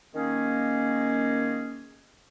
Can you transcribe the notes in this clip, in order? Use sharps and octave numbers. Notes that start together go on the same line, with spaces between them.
D#3 A#3 C#4 G#4